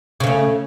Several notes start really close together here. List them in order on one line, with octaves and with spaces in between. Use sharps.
C#3 C#4 A3